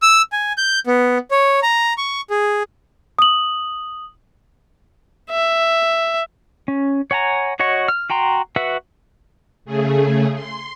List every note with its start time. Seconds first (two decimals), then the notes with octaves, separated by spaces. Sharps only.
0.02 E6
0.32 G#5
0.57 G6
0.87 B3
1.31 C#5
1.62 A#5
1.98 C#6
2.30 G#4
3.19 D#6 F#7
5.30 E5
6.68 C#4
7.11 C#5 F#5 G#5 A#5
7.60 F#4 C#5 D#5 F#5 C#6
7.88 F6
8.10 F#4 G5 A#5 C6
8.56 F#4 B4 E5 F#5 E6
9.65 C#3 A3 G#4
10.34 C6